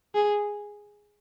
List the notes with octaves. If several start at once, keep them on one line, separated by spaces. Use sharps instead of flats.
G#4